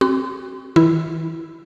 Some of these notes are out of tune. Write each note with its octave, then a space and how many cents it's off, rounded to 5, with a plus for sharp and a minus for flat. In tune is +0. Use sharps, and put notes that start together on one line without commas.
C4 +30 F#4 +30 C6 -35
E3 -40 E4 +0